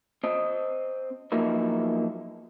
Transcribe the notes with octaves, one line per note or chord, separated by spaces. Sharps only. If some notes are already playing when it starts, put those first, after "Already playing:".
C4 D#5
F3 F#3 A#3 B3 D#4 E4